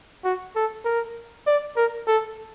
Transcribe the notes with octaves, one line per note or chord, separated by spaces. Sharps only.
F#4
A4
A#4
D5
A#4
A4